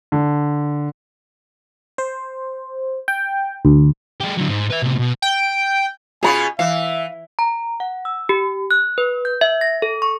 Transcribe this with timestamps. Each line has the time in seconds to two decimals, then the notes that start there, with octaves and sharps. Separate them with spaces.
0.12 D3
1.98 C5
3.08 G5
3.65 D2
4.20 G#3 G4
4.37 D3 F#3
4.49 G#2
4.70 B4 E5
4.82 A2 C3
4.98 B2
5.22 G5
6.23 B2 C#4 F4 G#4 G#5 A#5 B5
6.59 E3 E5 F5
7.39 A#5
7.80 F#5
8.05 E6
8.29 G4
8.71 F#6
8.98 B4
9.25 G6
9.41 E5
9.61 A#6
9.82 A4
10.02 C#6